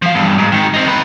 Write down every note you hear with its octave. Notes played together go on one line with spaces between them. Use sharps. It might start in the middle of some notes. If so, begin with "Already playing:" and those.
F3 F5
E2 G2
G#2
G#2 D#3
C4 D#4
D#3 B4